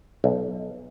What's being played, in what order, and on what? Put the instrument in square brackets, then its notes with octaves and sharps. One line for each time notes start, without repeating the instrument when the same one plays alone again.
[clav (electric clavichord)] B1